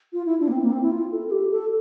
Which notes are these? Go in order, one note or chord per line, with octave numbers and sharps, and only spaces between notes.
F4
E4
D4
A#3
C4
A#3
C4
E4
F4
A4
A4
G4
A4